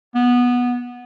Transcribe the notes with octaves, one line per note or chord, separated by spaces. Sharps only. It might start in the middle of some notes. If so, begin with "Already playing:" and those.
B3